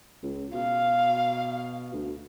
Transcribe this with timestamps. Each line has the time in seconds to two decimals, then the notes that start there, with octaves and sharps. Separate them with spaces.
0.23 C#2
0.53 B2 F5
1.93 D2